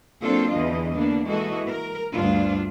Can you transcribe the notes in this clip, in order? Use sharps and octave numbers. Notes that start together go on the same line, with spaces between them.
F#3 A#3 C4 D4 F4 A4
E2 D3 E3 D#5
D3 A#3 B3 D4
E3 G#3 A#3 F#4 A4 D#5
A#4
D2 G2 D4 F4